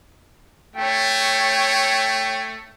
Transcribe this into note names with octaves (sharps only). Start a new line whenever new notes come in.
A3 C#5 G5